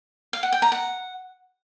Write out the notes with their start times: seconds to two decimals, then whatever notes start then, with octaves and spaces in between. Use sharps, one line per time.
0.33 F5
0.43 F#5
0.53 G5
0.62 A#5
0.72 F#5